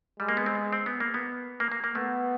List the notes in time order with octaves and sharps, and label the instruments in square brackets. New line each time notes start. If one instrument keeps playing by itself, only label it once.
[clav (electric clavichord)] G3 [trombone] G#3
[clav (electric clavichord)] A#3
B3
C4
B3
C4
B3
A#3
B3
A#3
A#3
A#3
[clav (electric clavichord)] A3 [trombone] B3